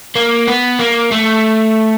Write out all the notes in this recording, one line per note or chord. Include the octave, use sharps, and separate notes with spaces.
A#3
B3
A#3
A3